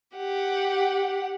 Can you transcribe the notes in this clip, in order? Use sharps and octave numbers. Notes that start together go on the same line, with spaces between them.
G4 F#5